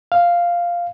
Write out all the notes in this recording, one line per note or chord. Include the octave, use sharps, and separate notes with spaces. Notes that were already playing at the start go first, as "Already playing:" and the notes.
F5